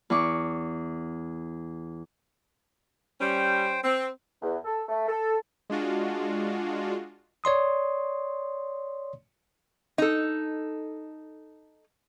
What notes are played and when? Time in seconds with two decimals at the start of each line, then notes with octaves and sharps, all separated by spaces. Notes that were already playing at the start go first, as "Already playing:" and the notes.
0.10 E2 E4 C#6 D6
3.21 G3 C#4 C5 G5
3.84 C4
4.42 E2
4.64 A4
4.89 A3
5.07 A4
5.70 G#3 D4 F4 F#4
7.44 C#5 D5 C6 D#6
9.98 D#4 A4